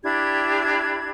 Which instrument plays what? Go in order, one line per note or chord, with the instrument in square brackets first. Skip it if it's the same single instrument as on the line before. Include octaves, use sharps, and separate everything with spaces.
[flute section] D4 E4 G4 G#6